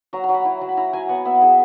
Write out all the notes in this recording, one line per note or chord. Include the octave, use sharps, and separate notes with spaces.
F#3 A#5
A#5
F#3
B5
E4
F#3
B5
E4 A#5
F#3 G#5
B3 F#5
B3 E5
E4 G#4